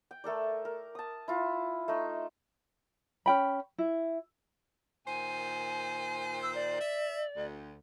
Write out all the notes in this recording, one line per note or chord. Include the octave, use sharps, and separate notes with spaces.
G5
A3 A4 A#4 D5
A#4
A5 D#6
E4 F4
A3 D#4
C#4 G5 B5
E4
A#2 D#3 C5 G#5
E6
D5
E5
D2